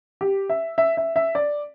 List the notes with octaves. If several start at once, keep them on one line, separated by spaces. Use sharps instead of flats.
G4
E5
E5
E5
E5
D5